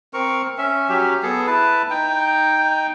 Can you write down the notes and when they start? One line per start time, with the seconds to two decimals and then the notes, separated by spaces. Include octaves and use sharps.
0.13 C4 A#4 C#6
0.58 C#4 E5
0.89 F#3 C#4 G4
1.23 B3 G#4 A4
1.47 E4 B4 A5
1.90 D#4 G5